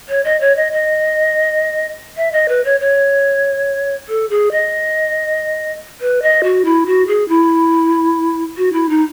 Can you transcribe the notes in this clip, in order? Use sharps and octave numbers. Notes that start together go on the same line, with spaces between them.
C#5
D#5
C#5
D#5
D#5
E5
D#5
B4
C#5
C#5
A4
G#4
D#5
B4
D#5
F#4
E4
F#4
G#4
E4
F#4
E4
D#4